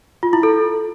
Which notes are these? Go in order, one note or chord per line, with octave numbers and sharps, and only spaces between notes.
F4
E4
A4